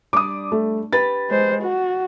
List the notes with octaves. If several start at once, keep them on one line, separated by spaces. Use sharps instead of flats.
G3 D4 D6 D#6
A3
G4 B4 A6
G#3 C5
F#4